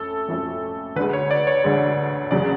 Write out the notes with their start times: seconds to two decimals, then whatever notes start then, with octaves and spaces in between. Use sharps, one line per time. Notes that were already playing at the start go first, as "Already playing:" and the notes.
Already playing: F2 A3 C#4 A4
0.28 F2 F3 A3 C#4
0.96 D2 D3 G#3 B4
1.13 C#5
1.31 D5
1.47 C#5
1.64 D2 D3 G#3 C#5
2.31 F#1 C#3 F#3 D5